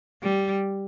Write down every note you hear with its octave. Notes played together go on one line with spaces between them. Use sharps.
G3